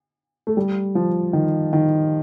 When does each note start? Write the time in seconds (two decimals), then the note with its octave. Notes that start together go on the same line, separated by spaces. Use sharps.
0.47 A3
0.57 G3
0.95 F3
1.33 D#3
1.73 D#3